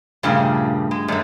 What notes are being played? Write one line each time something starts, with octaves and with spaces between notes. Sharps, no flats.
G2 A#2 C#3 F3 A3
G#3
F#2 G#3 A3